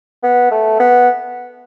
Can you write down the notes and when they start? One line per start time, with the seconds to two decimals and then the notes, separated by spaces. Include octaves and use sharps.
0.23 B3
0.51 A3
0.80 B3